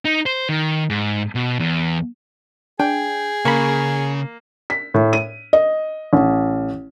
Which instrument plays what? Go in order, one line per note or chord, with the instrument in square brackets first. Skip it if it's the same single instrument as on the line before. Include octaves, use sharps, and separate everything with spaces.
[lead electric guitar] D#4
C5
D#3
G#2
B2
E2
[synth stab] D4 [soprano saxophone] G#4 [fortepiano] G5
[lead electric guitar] C#3 [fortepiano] A#3 [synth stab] B5 C#6
[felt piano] B6
A2
D#7
D#5
A1